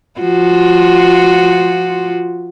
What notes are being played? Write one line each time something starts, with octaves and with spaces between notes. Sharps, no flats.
F3 F4 F#4